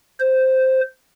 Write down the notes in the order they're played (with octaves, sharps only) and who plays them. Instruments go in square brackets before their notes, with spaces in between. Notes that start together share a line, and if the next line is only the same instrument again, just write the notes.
[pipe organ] C5